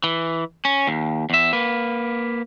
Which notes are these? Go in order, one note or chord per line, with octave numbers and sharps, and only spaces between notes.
E3
C#4
D#2
E2 E5
A#3 B4